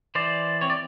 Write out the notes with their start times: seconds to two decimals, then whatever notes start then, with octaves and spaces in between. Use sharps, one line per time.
0.15 E3 C5 D5
0.61 C4 C#5
0.70 D5